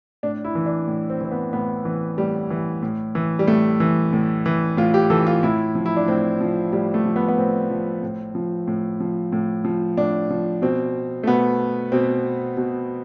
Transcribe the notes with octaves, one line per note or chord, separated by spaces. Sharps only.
A2 D4
E4
E3
D4
A2
C4
E3 C4
B3
A2 B3
E3
A2 G3
E3
A2
E3
G3
A2 A3
E3
A2
E3
A2 F4
G4
E3 A4
F4
A2 E4
F3
E4
D4
A2 C4
F3
A2 G3
A3
F3
B3
B3
A2 C4
F3
A2
F3
A2
F3
A2
F3
A2 D4
F3
B2 C4
A3
B2 B3
B2 C4
B2